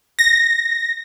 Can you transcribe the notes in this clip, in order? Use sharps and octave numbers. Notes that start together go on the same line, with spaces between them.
A#6